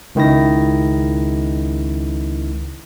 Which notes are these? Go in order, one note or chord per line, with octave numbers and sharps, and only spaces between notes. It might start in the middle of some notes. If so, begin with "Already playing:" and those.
C#2 D#3 E4 A#6